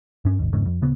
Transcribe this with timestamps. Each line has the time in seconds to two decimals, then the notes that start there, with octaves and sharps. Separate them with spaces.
0.25 G2 C#4
0.39 G#1 D#2
0.53 G1 E2 G#2 C#3
0.66 F2
0.82 D1 C#3 B3